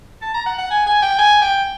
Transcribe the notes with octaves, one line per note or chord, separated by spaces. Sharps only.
A5
A#5
F#5
F#5
G#5
G#5
G5
G#5
G5